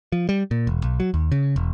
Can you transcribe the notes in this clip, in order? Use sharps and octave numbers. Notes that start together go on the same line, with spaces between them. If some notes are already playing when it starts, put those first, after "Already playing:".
F3
G3
A#2
E1
B1
F#3
D#2
C#3
E1